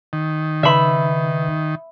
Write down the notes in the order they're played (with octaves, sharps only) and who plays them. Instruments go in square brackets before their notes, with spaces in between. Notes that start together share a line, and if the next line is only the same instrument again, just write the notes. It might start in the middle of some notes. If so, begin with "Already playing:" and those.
[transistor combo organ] D#3
[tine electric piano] C#3 D#4 B4 [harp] E5 B5